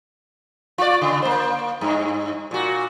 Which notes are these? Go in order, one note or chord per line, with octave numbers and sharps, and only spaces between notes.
F4 D5
C#3
A#3 C5
G2
A#2 F#4